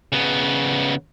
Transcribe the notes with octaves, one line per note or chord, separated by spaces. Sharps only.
C#3 B3